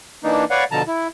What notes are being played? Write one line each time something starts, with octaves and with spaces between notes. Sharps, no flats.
E3 A#3 D4 D#4
B4 C#5 D5 F5 F#5 C#6
B2 D3 F3 A5 A#5
E4